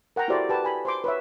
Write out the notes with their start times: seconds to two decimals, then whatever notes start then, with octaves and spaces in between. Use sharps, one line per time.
0.16 A#4 F#5 G5 A#5
0.28 E4 F#4 G4 A4 C5 D5
0.49 G4 B4 A5
0.64 G#5 B5
0.85 C5 C6 D6
1.04 B4 C#5 E5